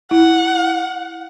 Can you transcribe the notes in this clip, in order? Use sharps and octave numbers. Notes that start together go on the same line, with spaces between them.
E4 F#5